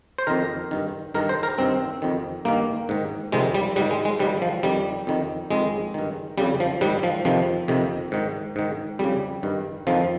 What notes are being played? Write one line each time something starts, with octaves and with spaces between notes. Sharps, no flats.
C5
F2 D#3 A#4
G2 D#3
G2 D#3 A#4
C5
A#4
G2 D#3 C4
F2 D#3
G2 D#3 A#3
G#2 D#3
F2 C3 D#3 G#3
G3
G#2 D#3 G3
G#3
G#3
G#2 D#3 G3
F3
F2 D#3 G3
F2 D#3
F2 D#3 G#3
G2 D#3
F2 C#3 G3
F3
G#2 D#3 G3
F3
F2 C3 D#3 F3
F2 C3 D#3
G#2 D#3
G#2 D#3
F2 C#3 G3
G2 D#3
F2 D#3 F3